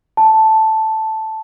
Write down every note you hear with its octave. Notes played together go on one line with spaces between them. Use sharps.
A5